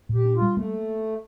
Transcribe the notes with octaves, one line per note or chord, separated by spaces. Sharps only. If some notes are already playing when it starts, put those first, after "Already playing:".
A#2
G4
D4
F4
G3
A3 A#3